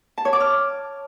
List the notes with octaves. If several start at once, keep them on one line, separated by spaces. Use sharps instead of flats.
A5
C#5
D6
F6